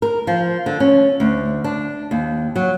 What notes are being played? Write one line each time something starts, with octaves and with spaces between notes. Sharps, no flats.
A#4
F3
D3
C#4
D2
D4
D#2
F#3